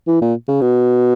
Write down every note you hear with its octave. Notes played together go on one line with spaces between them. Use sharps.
E3
A#2
C#3
B2